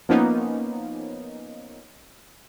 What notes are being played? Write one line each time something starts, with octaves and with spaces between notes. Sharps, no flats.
F3 A#3 B3 C#4 D#4